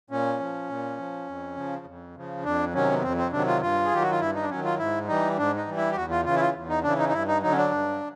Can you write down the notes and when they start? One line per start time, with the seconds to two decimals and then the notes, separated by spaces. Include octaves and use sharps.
0.10 A#2 C#4
0.40 F3
0.69 A#2
0.98 F3
1.27 F2
1.56 C#3 F3
1.86 F2
2.15 C#3 F3
2.44 F2 D4
2.74 C3 D#3 F#3 C#4
2.91 B3
3.03 F2 C4
3.17 C4
3.32 C3 D#3 F#3 D4
3.47 F4
3.62 G2 F4
3.85 G#4
3.91 D#3 F#3 G4
4.02 F#4
4.11 F4
4.20 G2 E4
4.35 D#4
4.43 D4
4.49 D#3 F#3 C#4
4.65 F4
4.79 G#2 E4
5.08 E3 G3 D#4
5.37 G#2 D4
5.57 D#4
5.66 E3 G3
5.77 E4
5.91 G4
5.96 E2 F#4
6.11 F4
6.25 C#3 E3 F4
6.36 E4
6.40 F4
6.54 E2
6.69 D#4
6.83 C#3 E3 D4
6.98 D#4
7.09 D#4
7.13 G2 E4
7.28 D#4
7.42 D3 F#3 D#4
7.52 C#4
7.57 D4
7.71 G2